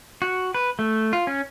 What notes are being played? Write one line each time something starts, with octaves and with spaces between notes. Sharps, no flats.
F#4
B4
A3
F4
C#4